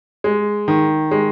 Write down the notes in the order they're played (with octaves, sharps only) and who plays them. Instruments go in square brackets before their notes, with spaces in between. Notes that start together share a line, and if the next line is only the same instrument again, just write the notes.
[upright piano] G#3
D#3
G#3